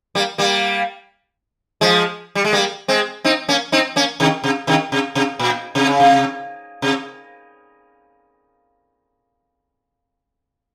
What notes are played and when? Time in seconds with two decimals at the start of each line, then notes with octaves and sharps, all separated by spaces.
0.15 G3 A#3
0.38 G3 A#3
1.81 F3 G#3
2.35 G3
2.45 G#3
2.53 G3 A#3
2.88 G#3 C4
3.24 C4 D#4
3.49 A#3 C#4
3.72 C4 D#4
3.96 A#3 C#4
4.20 C3 D#3
4.44 C3
4.67 C3 D#3
4.92 C3
5.15 C3
5.39 A#2
5.75 C3
5.87 C#3
6.00 C3
6.82 C3